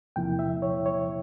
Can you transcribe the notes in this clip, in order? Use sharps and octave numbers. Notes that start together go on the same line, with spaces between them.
E2 C3 F3 A#3 E4 G5
E5
C#5
C#5